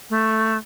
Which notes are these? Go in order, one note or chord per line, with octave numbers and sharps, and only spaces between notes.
A3